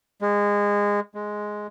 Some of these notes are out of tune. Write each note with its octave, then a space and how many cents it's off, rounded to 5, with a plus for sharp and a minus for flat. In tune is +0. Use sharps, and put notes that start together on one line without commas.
G#3 -20
G#3 +5